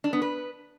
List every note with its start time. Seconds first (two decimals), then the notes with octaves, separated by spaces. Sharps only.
0.04 D4
0.13 B3
0.22 B4